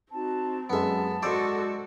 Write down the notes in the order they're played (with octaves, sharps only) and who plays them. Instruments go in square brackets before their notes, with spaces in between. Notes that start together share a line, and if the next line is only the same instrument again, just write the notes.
[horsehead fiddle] C4 [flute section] D#4 F#4 A5
[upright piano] F#2 G#3 [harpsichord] B3 E5 [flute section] A5
[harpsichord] G#2 C5 D5 [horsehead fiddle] F#4 A4 [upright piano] E6